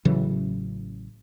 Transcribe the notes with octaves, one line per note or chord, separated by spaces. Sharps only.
A1 C#3 E3 F#3